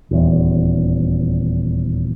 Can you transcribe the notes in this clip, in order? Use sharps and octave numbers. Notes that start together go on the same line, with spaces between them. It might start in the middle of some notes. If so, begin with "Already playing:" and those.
D#1 E2